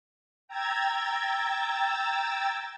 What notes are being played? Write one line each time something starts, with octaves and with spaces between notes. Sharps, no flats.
G5 A#5 E6 G#6 A6